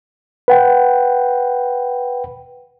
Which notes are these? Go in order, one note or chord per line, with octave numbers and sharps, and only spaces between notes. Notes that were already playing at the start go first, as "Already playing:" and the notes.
B4 F#5 G5